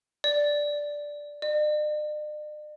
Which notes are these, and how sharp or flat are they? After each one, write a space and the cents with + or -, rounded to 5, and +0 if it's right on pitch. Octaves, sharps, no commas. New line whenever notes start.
D5 -5
D5 +45